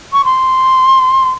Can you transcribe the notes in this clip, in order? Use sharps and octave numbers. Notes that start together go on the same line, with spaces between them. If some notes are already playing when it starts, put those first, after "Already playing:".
C#6
C6